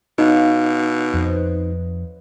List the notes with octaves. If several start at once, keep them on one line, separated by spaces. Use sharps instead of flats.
B2 D#4 C#5 F5 A5
F2 B4 C5 D#5